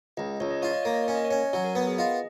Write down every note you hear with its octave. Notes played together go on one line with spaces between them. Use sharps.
C#2 D#5
C#2 C#5
D#5
F4 C#5
D#5
A#3 C#5
D#5
C#4 C#5
D#5
C#5
C#4
F#3 C#5
A#4
B3 A#4
G#4
F4 D#5